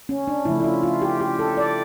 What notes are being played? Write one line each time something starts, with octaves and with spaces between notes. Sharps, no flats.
C#4
D4
C#3 F3 A3 E4
E4
F4
F4
G4
G4
A4
D5